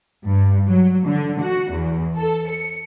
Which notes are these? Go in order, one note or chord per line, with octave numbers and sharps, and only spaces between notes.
G2
F#3
D3
F#4
E2
A4
C#7